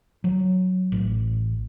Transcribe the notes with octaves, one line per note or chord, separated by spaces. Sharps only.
F#3
A1